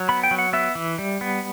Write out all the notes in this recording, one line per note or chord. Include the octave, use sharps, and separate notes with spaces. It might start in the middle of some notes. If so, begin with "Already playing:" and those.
Already playing: F#3
B3 B5
G5
F#3
F#5
B3 E5
E3
G3
B3